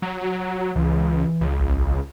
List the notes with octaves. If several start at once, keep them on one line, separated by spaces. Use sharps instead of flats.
F#3
C#2 E3
C#2
A#1